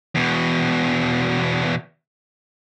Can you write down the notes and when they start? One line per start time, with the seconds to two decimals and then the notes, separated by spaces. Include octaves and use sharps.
0.15 E2 B2